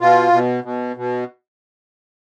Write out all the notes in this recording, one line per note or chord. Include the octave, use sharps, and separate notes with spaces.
B2 F4
B2
B2
B2